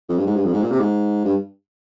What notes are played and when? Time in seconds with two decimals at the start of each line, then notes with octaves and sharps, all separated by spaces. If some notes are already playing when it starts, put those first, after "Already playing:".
0.09 F2
0.18 G2
0.27 G#2
0.36 G2
0.44 F2
0.53 G#2
0.63 A#2
0.71 C3
0.80 G#2
1.25 G2